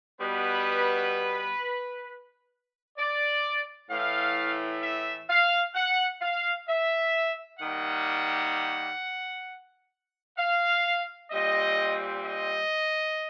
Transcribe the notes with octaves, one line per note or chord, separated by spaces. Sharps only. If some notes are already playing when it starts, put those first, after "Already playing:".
B2 G3 B3 B4
D5
A2 E3 A3 F5
E5
F5
F#5
F5
E5
D#3 G3 A#3 F#5
F5
A#2 G3 C4 D#5
D#5